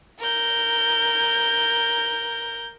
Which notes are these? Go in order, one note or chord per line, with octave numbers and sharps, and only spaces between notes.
A#4 G6